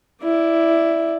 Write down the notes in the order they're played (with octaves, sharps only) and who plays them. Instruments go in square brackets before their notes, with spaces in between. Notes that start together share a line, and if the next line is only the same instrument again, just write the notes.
[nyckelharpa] E4 D5